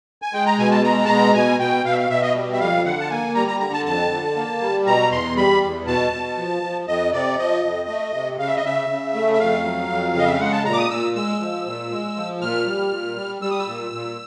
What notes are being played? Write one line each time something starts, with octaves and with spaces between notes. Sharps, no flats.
G#5
G#3 G5
A#5
B2 G#5
A5
G#3 A#5
A5
B2 A#5
B2 G#5
B2 G5
B2 F5
E5
F5
B2 E5
D#5
G3
E5
F2 F5
D3 F#5
A5
A#3 G#5
G3 A#5
A#5
D3 A#5
A5
F2 A5
D3
A#3
G3
B2 A#5
E2 C6
G3 B5
E2
B2 A5
B2
F3
F3
F2 D#5
C3 D5
F3 D#5
F2
A3
C3
C#3 F5
E5
D#5
C#3 E5
C#3
A3
E5
F2 F5
F#3
F2
C#3 D#5
E5
F5
G#3 F#5
A5
A#2 A#5
D6
D#6
A#2 E6
G#3 E6
F3
A#2
G#3
F3
A#2 F6
G3
A#2
G3
G3 E6
D#6
E6
A#2
A#2